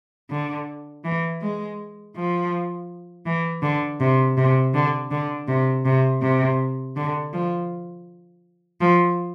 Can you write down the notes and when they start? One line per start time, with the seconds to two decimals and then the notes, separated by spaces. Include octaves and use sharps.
0.30 D3
1.05 E3
1.41 G#3
2.16 F3
3.26 E3
3.62 D3
4.00 C3
4.37 C3
4.74 D3
5.11 D3
5.48 C3
5.85 C3
6.22 C3
6.96 D3
7.33 F3
8.81 F3